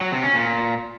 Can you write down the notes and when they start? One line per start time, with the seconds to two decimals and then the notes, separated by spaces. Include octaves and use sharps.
0.01 F#3
0.12 C3
0.24 C#4
0.35 A#2